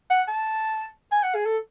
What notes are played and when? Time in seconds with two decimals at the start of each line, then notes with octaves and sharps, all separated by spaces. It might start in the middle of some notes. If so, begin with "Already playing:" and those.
0.10 F#5
0.28 A5
1.12 G#5
1.23 F#5
1.34 G#4
1.46 A4